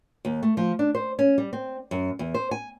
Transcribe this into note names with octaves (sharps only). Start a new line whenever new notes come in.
D#2
A3
F3
D4
C5
C#4
G3
C4
F#2
E2
C5
G#5